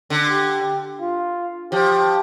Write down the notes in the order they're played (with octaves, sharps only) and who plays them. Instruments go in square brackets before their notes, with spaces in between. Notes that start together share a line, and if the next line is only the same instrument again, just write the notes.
[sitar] D3
[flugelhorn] G4
F4
[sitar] F3 [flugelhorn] G4